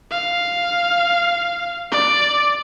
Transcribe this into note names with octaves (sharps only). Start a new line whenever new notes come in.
F5
D5